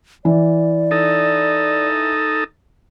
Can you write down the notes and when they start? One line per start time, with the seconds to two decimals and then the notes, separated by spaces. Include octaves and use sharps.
0.25 E3 D5
0.91 D#4 A4